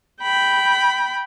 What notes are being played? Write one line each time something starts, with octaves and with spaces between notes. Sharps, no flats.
G5 B5